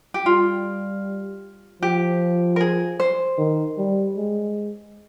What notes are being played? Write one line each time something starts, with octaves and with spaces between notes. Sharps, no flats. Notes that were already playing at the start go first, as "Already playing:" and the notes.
G4
G3 F4
F3 G4
A#4
G#4
C5
D#3
G3
G#3